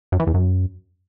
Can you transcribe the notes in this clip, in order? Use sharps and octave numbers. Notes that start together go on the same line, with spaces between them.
F#2
E3
E2
F#2